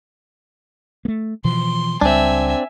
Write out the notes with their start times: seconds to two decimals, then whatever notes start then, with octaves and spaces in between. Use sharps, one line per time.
1.05 A3 A#3
1.44 B2 E3 F3 C6
2.01 C#2 G3 C4 D4 E5 G#5